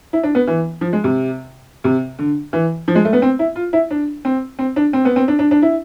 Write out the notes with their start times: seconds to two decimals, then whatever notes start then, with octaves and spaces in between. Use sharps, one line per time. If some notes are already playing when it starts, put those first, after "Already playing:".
0.13 E4
0.23 D4
0.35 B3
0.48 E3
0.81 F3
0.93 G#3
1.04 C3
1.84 C3
2.19 D3
2.53 E3
2.88 F3
2.95 G#3
3.05 A3
3.13 B3
3.22 C4
3.39 E4
3.56 F4
3.73 E4
3.91 D4
4.25 C4
4.59 C4
4.76 D4
4.93 C4
5.05 B3
5.16 C4
5.28 D4
5.39 D4
5.51 D4
5.62 E4